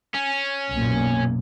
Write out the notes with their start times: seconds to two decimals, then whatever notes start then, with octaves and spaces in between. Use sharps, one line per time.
0.15 C#4
0.70 B1 F#2 A#2